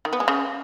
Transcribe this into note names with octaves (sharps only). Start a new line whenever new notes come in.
D#3
B3
G#3
C#3